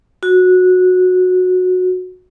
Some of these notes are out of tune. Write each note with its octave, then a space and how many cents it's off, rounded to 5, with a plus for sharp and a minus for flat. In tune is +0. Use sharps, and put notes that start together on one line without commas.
F#4 -15